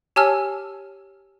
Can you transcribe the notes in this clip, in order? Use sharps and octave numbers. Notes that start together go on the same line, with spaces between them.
G4 C#5 G#5 A5 E6 F6